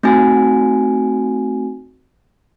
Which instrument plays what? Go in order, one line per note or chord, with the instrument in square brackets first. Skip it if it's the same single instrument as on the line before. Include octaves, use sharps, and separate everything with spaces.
[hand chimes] A3 C4 D#4 F#4 G#5